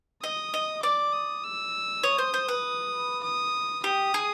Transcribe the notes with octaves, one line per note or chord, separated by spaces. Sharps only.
D#5 D#6
D#5
D5 D6
D#6
E6
C#5 D#6
C5
C5
B4
D#6
G4 D#6
G#4